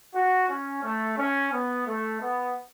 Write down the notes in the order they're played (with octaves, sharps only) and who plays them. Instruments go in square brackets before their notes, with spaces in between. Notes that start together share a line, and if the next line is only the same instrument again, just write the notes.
[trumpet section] F#4
C#4
A3
C#4
B3
A3
B3